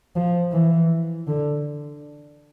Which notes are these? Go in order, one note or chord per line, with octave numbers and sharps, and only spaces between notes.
F3
E3
D3